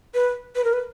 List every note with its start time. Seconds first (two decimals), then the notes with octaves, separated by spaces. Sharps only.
0.14 B4
0.56 B4
0.64 A#4
0.73 B4